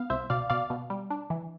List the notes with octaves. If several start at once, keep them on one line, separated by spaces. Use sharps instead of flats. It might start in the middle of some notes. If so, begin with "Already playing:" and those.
Already playing: B3 F5
C2 C5 E5
B2 D5 F5
B2 D5 F5
B2
G3
D4
E3